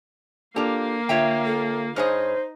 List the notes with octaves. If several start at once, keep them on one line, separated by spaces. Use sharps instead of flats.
A#3 D4 F4 G4 A4 F5
D3 F4 C#5 E5 G5
A4
G2 D#4 G#4 C5 C#5 D#5 F6